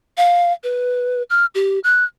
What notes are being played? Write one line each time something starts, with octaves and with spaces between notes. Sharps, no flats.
F5
B4
F6
G4
F#6